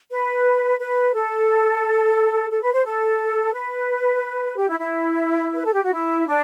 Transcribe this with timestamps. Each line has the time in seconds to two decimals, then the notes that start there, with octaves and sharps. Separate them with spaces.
0.11 B4
0.80 B4
1.14 A4
2.51 A4
2.62 B4
2.73 C5
2.85 A4
3.53 B4
4.57 G4
4.68 E4
4.79 E4
5.55 B4
5.65 A4
5.74 G4
5.84 F#4
5.93 E4
6.27 D4